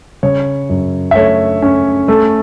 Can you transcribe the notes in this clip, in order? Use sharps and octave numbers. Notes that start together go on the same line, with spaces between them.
C#3 C#5
F#2
E5
A3 C#5
C#4
A3